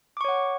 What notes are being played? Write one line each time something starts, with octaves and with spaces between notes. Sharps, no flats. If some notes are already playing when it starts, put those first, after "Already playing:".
C#5 F#5 C#6 D6